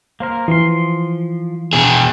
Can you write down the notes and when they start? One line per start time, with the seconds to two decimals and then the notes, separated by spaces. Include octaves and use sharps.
0.20 A#3 A#4 C5 F5
0.48 E3 F3 C6
1.73 B2 G#4